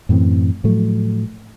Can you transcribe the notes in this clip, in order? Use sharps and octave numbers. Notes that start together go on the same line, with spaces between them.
F#2 A2 E3 C4
A2 F3 F#3 A3